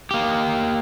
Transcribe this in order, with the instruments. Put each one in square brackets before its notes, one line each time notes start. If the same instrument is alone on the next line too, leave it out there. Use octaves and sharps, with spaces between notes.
[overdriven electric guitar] A#3 G4